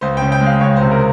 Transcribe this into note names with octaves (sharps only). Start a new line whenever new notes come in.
C#2 C5
G5
C#3
G5
G#3
F5
C#2 C#5
C5
C3
A#4